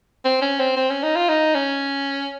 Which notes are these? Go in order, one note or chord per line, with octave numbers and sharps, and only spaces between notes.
C4
C#4
C4
C4
C#4
D#4
F4
D#4
C#4